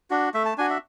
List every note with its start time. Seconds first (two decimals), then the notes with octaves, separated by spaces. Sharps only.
0.10 D4 F#4
0.34 A3 E5
0.45 A5
0.58 D4 F#4 G#5
0.70 E5